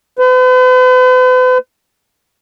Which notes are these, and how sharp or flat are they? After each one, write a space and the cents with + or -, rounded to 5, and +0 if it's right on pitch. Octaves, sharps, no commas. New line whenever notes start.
B4 +45